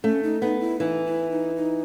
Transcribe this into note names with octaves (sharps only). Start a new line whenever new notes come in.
A3 C#4
D#4
B3 D#4
E4
E3 D#4
E4
D#4
D#4